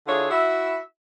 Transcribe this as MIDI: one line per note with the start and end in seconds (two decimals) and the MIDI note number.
0.07 0.28 50
0.07 0.28 62
0.07 0.28 64
0.07 0.28 65
0.07 0.28 68
0.07 0.28 73
0.30 0.76 64
0.30 0.76 66
0.30 0.76 76